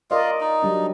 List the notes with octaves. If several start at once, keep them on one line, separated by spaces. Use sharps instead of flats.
F4 A#4 D5 D#5
D#4
F#3 G3 D4